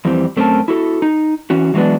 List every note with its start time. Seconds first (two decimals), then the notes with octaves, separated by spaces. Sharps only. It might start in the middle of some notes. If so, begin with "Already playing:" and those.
0.05 F2 E3 G3 C4
0.36 F#2 A3 C4 C#4 A#4 A5
0.68 E4 F#4 A4
1.02 D#4
1.50 E3 C#4 F#4
1.74 E3 F#3 G#3 B3 D4